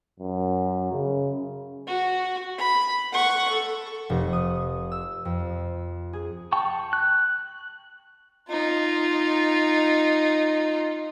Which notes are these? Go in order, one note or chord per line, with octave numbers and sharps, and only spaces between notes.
F#2
C#3
F#4
B5
F#5 C#6
A4
F1
D#6
E6
F2
G#4
G5 A5 C#6
F#6
D#4 F4